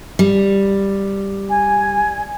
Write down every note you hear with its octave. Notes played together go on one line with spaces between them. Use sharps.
G3
G#5